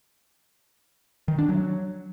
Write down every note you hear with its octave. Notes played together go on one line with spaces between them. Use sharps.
D#3
D4
F#3